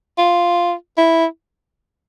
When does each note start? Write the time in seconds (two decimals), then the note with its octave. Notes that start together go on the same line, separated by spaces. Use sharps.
0.18 F4
0.98 E4